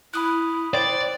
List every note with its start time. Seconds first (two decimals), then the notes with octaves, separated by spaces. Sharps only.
0.14 E4 B5 D#6 F#6
0.74 C5 D5 G5 A6